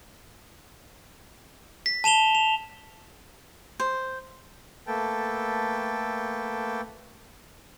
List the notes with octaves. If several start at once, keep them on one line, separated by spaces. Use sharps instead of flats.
B6
A5 E7 F7 G7
F7
C5
A3 A#3 A4 B4 G5 A5